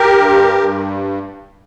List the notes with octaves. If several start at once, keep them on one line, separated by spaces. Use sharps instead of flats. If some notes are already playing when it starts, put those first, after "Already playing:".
Already playing: G4 A#4
G2
G2